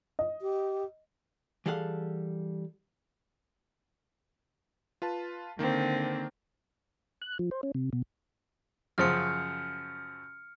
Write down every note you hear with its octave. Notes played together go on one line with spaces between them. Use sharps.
D#5
G4
E3 G3 G#4 A4 F5 F#5
F4 B4 A5
D3 D#3 A#3 C4
F#6
F3
C5
C#4
C3
B2
F#2 C#3 F3 F6 C#7